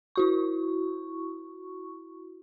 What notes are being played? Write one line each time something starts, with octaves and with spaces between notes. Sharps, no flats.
E4 F#4 C#6